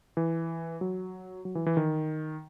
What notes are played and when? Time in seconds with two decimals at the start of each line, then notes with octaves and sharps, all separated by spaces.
0.17 E3
0.81 F#3
1.45 F#3
1.55 E3
1.66 E3
1.77 D#3